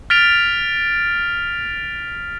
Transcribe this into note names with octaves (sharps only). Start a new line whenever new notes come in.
F6 A6 B6 D7 F7